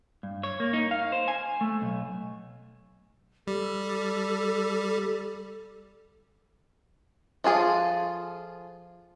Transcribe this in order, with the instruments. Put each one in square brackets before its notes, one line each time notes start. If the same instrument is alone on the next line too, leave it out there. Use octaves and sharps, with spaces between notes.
[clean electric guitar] G2
C#5
A#3
D#4
F5
C5
G#5
A3
B1
[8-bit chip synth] G3 [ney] A4
[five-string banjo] F3 F4 G#4 A4